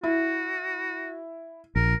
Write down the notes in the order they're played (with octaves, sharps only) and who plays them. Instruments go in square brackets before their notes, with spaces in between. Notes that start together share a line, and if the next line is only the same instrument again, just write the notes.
[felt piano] E4 [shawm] F#4
[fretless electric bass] A#1 [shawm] A#4